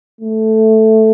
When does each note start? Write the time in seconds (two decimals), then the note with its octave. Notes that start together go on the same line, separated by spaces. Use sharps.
0.21 A3